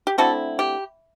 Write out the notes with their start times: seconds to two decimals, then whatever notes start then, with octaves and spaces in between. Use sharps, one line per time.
0.07 G4
0.18 D3 A3 C4 E4 F#4 A4
0.59 G4